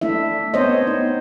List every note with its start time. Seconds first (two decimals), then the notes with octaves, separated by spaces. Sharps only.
0.01 A3 D4 E4 E5
0.54 B3 C4 C5 C#5 D#5
0.87 D#4